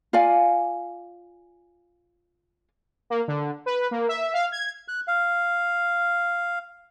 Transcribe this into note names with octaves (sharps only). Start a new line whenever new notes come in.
F4 D5 F5 G#5
A#3
D3
B4
A#3
E5
F5
G#6
F#6
F5